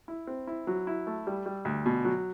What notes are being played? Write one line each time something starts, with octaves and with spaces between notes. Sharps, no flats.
E4
C4
E4
F#3
E4
A3
G3
G3
D2
B2
F#3